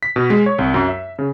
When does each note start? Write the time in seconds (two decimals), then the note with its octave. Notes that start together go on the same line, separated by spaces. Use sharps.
0.03 B6
0.16 B2
0.30 G#3
0.46 C#5
0.59 C2
0.74 F#2
0.88 E5
1.19 C#3